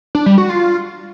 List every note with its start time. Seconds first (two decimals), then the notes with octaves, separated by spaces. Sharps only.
0.15 D4
0.26 G3
0.38 F#4
0.49 F4